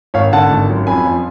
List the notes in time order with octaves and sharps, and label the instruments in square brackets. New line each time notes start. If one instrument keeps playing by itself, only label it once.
[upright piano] G#1 C#5 F5
D3 F#5 A5
G#1
F#2
F2 G#5 B5
F3